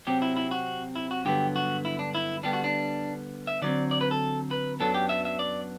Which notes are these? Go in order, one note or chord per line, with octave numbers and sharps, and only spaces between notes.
C3 F#3 C4 G4
E4
E4
F#4
E4
F#4
G2 D3 F#3 B3 G4
F#4
E4
D4
E4
D3 G3 B3 D4 G4
F#4
D4
E5
D3 F#3 C4 D5
D5
B4
A4
B4
F#2 F#3 B3 D4 A4
G4
E5
E5
D5